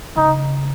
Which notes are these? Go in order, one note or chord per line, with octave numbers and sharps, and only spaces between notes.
C#3 D#4